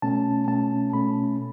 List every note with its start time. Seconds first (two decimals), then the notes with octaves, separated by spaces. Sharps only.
0.02 B2 A3 C#4 A5
0.47 B2 A3 C#4 A5
0.93 B2 A3 C#4 B5